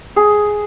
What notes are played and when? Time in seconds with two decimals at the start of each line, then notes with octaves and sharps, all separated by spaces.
0.16 G#4